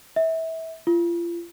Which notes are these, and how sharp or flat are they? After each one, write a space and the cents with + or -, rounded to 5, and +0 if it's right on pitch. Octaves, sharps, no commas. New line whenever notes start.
E5 -25
F4 -35